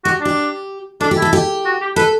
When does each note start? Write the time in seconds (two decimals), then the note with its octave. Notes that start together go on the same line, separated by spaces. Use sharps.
0.04 F#4 G4
0.21 D4 G4
1.01 D4 A4
1.11 G4
1.17 E4
1.22 A4
1.33 G4
1.65 F#4
1.81 G4
1.96 A4 B4